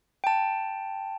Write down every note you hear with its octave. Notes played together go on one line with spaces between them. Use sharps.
G5 A5